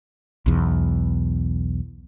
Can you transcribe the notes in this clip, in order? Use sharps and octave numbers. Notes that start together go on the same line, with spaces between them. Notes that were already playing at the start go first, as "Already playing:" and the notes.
B1 E2